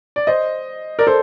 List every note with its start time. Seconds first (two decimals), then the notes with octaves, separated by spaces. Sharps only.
0.16 D5
0.27 C5 D#5
0.99 A#4 D5
1.07 A4 C5